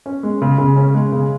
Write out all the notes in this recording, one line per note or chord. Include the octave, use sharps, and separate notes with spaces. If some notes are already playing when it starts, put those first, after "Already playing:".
C#4
G#3
C#3
C#3
C#4
G#3
C#3